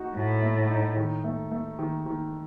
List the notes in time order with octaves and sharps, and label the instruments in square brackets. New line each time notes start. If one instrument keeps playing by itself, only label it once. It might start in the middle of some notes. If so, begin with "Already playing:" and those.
Already playing: [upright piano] D#4 F#4
[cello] A2 [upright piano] F#4
[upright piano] A3
D#4
D#3
A3
A3
D#3
D#3